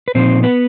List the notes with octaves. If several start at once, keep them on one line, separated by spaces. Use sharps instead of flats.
B4
A#2 F3 A#3 C4 D#4 C5
B3 B4